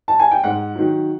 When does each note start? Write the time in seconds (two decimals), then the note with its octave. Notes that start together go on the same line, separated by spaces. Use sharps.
0.08 A5
0.20 G#5
0.31 G5
0.44 G#2 F#5
0.75 D#3 F#3